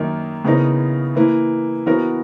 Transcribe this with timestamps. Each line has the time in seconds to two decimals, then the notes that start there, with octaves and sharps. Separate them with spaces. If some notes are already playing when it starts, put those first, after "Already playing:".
Already playing: F#2 D#3 A#3 D#4
0.44 C#3 E3 B3 D#4 A#4
1.15 E3 A#3 E4 B4
1.86 E3 B3 F#4 A#4